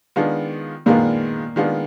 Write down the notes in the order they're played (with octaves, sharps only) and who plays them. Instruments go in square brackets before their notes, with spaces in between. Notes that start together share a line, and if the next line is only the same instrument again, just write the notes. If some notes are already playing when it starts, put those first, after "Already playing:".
[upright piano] D#3 G#3 B3 D4 F4
[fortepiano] A#2 A#3 [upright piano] D#3 G#3 B3 D4 F4
[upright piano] D#3 G#3 B3 D4 F4